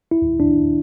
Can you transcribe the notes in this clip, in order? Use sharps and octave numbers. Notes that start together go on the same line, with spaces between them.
E4
D4